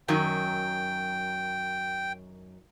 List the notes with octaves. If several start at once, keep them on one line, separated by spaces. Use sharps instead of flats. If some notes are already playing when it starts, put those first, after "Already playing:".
F#2 D#3 F#3 G5